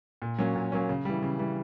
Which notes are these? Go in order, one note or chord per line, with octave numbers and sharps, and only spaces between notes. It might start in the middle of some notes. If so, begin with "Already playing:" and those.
A#2
F#3 A#3 C#4
A#2
F#3 A#3 C#4
C#3
E3 G3
C#3
E3 G3